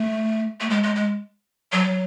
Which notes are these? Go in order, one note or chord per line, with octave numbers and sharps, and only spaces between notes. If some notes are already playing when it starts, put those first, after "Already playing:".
Already playing: A3
A3
G#3
G#3
G#3
F#3